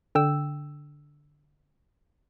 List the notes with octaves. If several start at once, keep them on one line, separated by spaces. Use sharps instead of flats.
D3 G5 E6